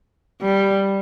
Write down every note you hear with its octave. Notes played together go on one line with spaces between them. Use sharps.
G3